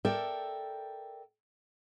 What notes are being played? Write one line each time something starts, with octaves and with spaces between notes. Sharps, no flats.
A4 A#4 D5 E5 G5 A5